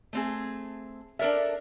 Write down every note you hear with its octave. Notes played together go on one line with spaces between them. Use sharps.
A3 C4 G#4
D4 A4 A#4 D5 E5